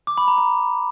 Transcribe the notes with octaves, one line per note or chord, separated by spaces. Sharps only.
D6
B5
A#5
A#5